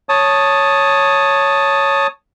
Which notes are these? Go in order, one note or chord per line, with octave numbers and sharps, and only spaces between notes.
C#5 A5 D#6